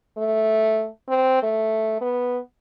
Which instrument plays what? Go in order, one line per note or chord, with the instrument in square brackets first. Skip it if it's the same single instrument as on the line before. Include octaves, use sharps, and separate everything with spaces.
[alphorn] A3
C4
A3
B3